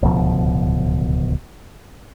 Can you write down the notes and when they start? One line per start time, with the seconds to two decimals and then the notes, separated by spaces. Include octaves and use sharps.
0.02 D1 C#2 B2 F3